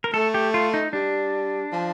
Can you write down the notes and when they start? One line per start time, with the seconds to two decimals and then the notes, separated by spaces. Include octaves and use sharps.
0.04 A#4
0.14 A3 A4
0.34 G4
0.54 F4
0.74 D#4
0.93 G3 D4
1.72 F3